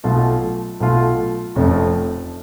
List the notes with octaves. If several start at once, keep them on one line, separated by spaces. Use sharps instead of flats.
B1 B2 A3 F4
B1 B2 A3 F4
F1 F2 F3 A3 C#4